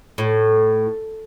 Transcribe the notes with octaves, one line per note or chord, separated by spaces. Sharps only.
A2